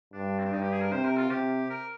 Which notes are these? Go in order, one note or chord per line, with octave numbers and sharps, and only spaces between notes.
G2 D4
C4
D4
G2 D#4
G4
G#4
A#4
C3 C5
A#4
F4
C3 G4
A#4